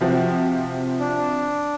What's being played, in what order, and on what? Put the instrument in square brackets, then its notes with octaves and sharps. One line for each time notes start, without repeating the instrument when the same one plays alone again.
[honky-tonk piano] C3 F3 F#4
[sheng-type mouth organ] D4